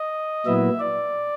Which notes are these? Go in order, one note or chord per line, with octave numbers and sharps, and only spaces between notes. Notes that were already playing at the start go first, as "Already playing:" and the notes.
Already playing: D#5
A#2 F#3 B3 E4 E5
D5